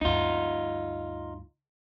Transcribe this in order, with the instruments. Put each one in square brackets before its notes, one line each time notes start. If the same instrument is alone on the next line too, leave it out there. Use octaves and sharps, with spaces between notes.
[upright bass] D2 G2 [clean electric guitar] D#4 F4